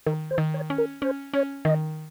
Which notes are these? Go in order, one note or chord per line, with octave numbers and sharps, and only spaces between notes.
D#3 A#4
C5
D#3
C#5
C#4
A#4
C#4 C5
C#4 C#5
D#3 D#5